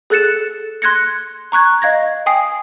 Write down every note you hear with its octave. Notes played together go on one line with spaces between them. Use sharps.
G#4 A4 F#6 A6 C#7 E7
C6 F#6 G#6 A#6 C#7
A#5 C#6 F#6 G#6
D#5 F5 G#6 A#6
G5 G#5 D#6 C7